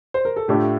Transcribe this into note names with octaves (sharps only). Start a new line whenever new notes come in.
C5
A#4
A4
A2 A3 D4 F4 G4